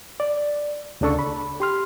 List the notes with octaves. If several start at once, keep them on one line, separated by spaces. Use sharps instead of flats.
D5
D2 C#3 D4 A4 C#6
B5
G4 C6 F6